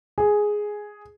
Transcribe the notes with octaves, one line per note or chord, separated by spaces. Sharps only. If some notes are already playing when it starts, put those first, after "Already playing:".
G#4